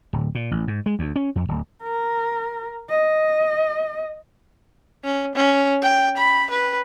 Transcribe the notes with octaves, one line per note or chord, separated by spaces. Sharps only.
D1
A#2
A1
G#2
G#3
D2
C#4
F2
D1
A#4
D#5
C#4
C#4
G5
B5
B4